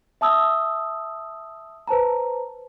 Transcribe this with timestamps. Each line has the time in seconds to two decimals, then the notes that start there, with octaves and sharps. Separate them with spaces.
0.21 E5 A5 D#6 E6
1.88 B4 C5 A5 A#5